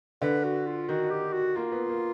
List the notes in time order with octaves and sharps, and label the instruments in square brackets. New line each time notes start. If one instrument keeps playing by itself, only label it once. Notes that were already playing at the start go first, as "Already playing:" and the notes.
[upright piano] D3 [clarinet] B4
[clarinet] F#4
F4
[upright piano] D#3 [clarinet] F#4
[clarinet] G4
F#4
[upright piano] A#3 [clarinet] F4
[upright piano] B3
A#3